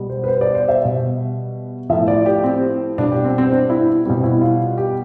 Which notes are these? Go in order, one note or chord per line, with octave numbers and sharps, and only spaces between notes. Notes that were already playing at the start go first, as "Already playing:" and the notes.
Already playing: B2 G3
C5
B4
C5
D5
C5
E5
B2 G3
A2 F3 E5
D5
G4
C4
B2 G3 D4
G4
C4
C4
D4
E4
B2 G3 C4
E4
F4
G4